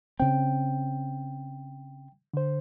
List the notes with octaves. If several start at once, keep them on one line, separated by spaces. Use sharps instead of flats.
C#3 C4 G5
D3 C5